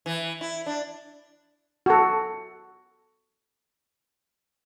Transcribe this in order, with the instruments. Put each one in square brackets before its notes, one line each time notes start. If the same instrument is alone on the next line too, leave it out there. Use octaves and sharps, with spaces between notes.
[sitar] E3
E4
D4
[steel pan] F#4 A4